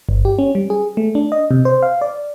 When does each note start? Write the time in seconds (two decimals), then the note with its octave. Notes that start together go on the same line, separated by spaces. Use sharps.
0.09 G1
0.25 G4
0.39 C#4
0.55 G3
0.70 G#4
0.97 A3
1.15 D4
1.32 D#5
1.51 C3
1.65 C5
1.83 F5
2.02 D5